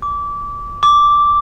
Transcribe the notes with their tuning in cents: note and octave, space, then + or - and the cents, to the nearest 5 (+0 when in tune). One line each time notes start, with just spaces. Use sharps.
D6 -25
D6 -5